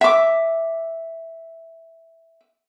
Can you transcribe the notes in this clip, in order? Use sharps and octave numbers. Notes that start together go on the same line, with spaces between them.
E5 D6